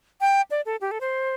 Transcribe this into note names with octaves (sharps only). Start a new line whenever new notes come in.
G5
D5
A4
G4
A4
C5